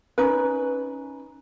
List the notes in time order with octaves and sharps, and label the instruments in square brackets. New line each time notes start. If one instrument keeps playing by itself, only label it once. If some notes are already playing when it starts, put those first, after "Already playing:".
[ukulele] C#4 D#4 B4